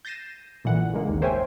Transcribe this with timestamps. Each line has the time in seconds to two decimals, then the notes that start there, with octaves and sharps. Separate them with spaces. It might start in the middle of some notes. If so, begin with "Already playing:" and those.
0.05 G6 A6 A#6 C7 D#7 E7
0.64 A#1 A#2 D3 E3 F#5
0.93 C#3 G#3 A#3
1.09 G#1 D#2
1.22 A#4 C5 C#5 E5 G5 G#5